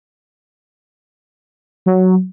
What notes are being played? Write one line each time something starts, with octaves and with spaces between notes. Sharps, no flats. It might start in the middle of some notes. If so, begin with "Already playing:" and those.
F#3